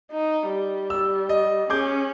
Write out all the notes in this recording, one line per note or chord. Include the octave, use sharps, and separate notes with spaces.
D#4
G3
E6
D#5
C#4 G#4 D6 G6